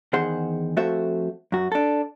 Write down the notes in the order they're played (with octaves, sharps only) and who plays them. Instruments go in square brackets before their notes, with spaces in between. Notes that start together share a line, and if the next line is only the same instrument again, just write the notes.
[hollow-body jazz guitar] E2 D#3 G#4 C5 F#5 C6
F2 A3 F#4 A4 C5 E5
F#2 F#4
D4 A4